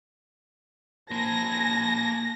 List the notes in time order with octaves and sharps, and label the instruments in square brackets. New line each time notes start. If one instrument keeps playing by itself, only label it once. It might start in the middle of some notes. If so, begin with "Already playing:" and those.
[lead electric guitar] A#3 C5 [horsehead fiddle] G#5 A5 [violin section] A#6